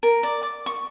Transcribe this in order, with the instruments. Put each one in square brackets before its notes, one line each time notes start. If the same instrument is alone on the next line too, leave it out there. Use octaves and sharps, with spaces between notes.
[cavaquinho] A#4
D5
D6
C#6